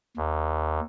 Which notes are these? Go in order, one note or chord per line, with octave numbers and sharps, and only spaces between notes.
D#2